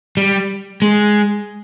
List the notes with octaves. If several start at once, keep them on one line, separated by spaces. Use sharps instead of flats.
G3
G#3